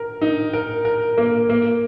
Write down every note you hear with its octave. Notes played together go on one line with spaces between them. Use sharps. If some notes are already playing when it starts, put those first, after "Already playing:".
Already playing: A#4
D#4
A#4
A#4
A#3
A#3